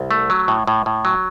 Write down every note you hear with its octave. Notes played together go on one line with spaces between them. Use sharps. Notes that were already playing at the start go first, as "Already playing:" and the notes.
Already playing: C2
A3
F#3
A2
A2
A2
F#3